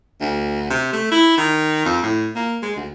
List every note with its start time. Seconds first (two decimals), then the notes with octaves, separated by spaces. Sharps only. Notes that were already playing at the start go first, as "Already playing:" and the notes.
0.21 D2
0.71 C3
0.93 A3
1.12 E4
1.38 D#3
1.85 F2
2.03 A2
2.36 A#3
2.63 G#3
2.76 D2